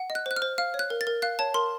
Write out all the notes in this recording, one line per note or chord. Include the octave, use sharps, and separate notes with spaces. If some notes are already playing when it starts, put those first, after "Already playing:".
Already playing: F#5
D#5
F#6
C5 F#6
F6
C5
F5 F6
C#5
F#6
A#4
A6
A#4
F5 F#6
C#5 A5
A#4 C6